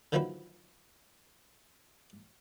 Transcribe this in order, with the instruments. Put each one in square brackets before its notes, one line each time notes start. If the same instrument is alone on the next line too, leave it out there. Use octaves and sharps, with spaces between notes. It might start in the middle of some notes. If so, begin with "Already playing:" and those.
[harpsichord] D3 D#3 F3 F#3 E4 B4